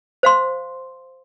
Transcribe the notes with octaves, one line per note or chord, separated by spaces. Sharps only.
C5 F5 C6